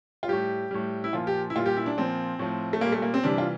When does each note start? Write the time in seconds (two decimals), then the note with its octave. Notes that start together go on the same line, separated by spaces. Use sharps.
0.23 F4
0.28 A2 G3 G4
0.71 A2 G3
1.04 E4
1.13 A#2 F3 F4
1.27 G4
1.50 E4
1.56 A#2 G3 F4
1.66 G4
1.77 E4
1.86 D4
1.97 A#2 F3 C4
2.39 A2 F3
2.73 A3
2.81 A#2 G3 A#3
2.92 A3
3.02 A#3
3.14 C4
3.24 C3 E3 G3 D4
3.38 F4